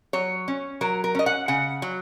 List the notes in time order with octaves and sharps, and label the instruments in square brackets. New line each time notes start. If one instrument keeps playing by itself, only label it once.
[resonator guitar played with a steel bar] F#3 C#5
C#4
F#3 A#4
A#4
C#4 D#5
F#5
C#3 F#5
F#3